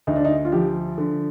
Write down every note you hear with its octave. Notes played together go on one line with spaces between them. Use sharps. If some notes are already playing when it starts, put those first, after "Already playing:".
D2 D#4
D4
D#4
F4
F3 G4
D3